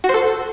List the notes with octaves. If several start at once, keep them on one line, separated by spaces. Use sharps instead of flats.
F#4
C5
A4